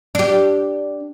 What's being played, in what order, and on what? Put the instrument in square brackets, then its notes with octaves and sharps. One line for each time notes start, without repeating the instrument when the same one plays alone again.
[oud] D4 G4